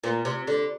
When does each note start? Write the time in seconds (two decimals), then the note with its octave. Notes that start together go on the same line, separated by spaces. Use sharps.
0.04 A#2
0.25 C3
0.47 D3